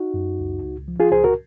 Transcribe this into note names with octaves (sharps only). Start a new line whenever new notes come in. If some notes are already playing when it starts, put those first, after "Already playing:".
Already playing: D#4 F#4
F#2
C#2
C#2
F3
F4 G#4
C#2 G#4 C5
F#4 A#4